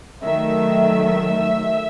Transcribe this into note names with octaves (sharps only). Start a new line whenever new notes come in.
D#3 F#3 A3 E5